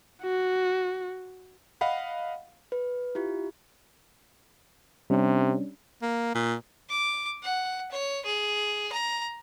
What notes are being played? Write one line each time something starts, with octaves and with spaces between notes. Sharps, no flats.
F#4
D#5 F5 F#5 B5
B4
E4 F4 G4
C3 G3 C#4 D4
A#3
A#2
D6
F#5
C#5
G#4
A#5